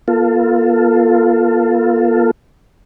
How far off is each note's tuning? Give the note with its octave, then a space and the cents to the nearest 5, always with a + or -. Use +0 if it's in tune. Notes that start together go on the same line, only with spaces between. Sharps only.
A#3 +45 F4 +0 A4 +15